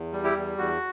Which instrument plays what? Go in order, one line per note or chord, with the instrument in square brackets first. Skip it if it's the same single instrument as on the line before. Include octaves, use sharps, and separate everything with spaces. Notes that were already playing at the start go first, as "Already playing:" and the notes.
Already playing: [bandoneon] E2
G3
E4 G4
E2
E2 F#4